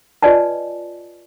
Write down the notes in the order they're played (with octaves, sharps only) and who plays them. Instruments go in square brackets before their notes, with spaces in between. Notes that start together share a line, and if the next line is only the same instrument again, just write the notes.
[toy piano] F4 B4 D5 D#5 G#5 A5